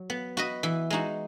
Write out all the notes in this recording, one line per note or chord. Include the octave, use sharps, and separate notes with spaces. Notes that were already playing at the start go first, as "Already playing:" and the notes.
Already playing: F#3
B3
F#4 B4 D#5
E3
G#3 D#4 F#4